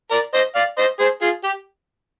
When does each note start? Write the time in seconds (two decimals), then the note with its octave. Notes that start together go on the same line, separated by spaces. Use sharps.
0.11 A#4 D5
0.34 C5 D#5
0.55 D5 F5
0.78 C5 D#5
1.00 G#4 C5
1.22 F4 G#4
1.44 G4